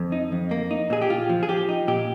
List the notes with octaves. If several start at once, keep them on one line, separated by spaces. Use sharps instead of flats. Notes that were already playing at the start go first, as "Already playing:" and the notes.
Already playing: F2
D#4
F2
A#3
D#4
A#2 G#4
G4
A#2 F4
F3
G#4
F3 G4
D#4
A#2 G4